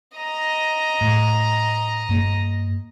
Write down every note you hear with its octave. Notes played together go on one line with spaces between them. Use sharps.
D#5 A#5
A2
G2 A#3